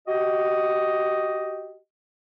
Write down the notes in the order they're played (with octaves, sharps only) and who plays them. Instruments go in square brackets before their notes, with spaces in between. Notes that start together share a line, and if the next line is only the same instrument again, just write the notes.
[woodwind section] F#4 G4 D#5